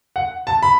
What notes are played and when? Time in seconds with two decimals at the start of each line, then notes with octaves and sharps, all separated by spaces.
0.16 F#5
0.47 A5
0.63 B5